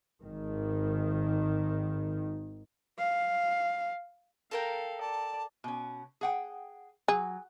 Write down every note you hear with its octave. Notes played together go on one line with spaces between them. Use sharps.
G#1 D#3
F5
A4 A#4 F5 G5
D5 A5
B2 C#4
G#4 F#5 G5
F#3 G#4